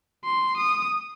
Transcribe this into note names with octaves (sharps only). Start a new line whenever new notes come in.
C6
D#6